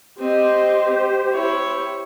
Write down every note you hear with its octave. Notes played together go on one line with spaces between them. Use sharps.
C4 G4 C5 D#5
E4 C#5